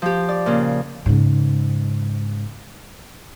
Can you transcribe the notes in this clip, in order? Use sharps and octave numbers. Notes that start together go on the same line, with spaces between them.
F3 G4
D5
A#2 C#3
G#2 C#3